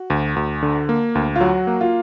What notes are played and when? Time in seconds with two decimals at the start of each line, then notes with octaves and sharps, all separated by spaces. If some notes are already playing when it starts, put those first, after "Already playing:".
Already playing: F#4
0.10 D2
0.36 D2
0.63 D3
0.89 A#3
1.15 D2
1.36 F4
1.41 F#3 F#4
1.67 A#3
1.81 F4